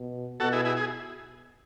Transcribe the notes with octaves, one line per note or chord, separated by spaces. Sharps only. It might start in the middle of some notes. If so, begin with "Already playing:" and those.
Already playing: B2
B2 F#4 A4
E4 G#4
E4 G#4
G#4